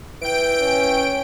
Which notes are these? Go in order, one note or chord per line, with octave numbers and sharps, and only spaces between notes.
E3 G5 D7
C#4